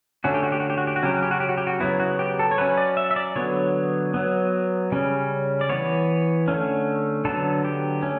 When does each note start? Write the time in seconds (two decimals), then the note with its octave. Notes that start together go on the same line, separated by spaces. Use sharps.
0.24 D3 A3 C#4 F#4
0.34 G4
0.43 F#4
0.52 G4
0.60 F#4
0.70 G4
0.78 F#4
0.87 G4
0.96 F#4
1.03 C#3 F#3 C#4 G4
1.14 F#4
1.22 G4
1.31 F#4
1.40 G4
1.49 F#4
1.58 G4
1.67 F#4
1.80 C#3 F#3 B3 E4
2.00 F#4
2.19 G4
2.39 A4
2.51 C#5
2.58 F#3 C#4 B4
2.78 D5
2.97 E5
3.11 E5
3.16 D5
3.36 D3 F#3 B3 C#5
4.14 F#3 B3
4.92 C#3 G3 C#4
5.61 D5
5.70 E3 B3 C#5
6.48 D3 A3 C#4
7.25 D3 F#3 B3 A4
7.65 G4
8.03 A3 C#4